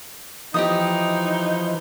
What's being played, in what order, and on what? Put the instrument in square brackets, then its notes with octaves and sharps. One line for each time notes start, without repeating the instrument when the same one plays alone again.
[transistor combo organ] E3 F3 [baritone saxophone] D#4 [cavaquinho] G4 D#5 D#6